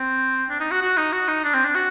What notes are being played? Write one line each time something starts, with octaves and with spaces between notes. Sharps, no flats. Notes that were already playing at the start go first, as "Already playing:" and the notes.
Already playing: C4
D4
D#4
F#4
F#4
D#4
F#4
D#4
D4
C4
D4
F#4